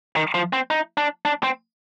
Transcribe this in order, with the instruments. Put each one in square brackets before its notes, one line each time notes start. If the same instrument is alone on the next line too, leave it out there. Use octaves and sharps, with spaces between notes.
[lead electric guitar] D#3
F3
C4
D#4
D4
D4
C4